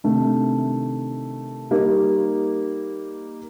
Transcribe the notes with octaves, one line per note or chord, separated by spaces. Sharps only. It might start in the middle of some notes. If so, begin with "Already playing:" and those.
C3 D#3 A3 D4
G3 A#3 D#4 G4